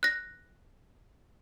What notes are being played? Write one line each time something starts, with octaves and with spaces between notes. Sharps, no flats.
F#6 A#6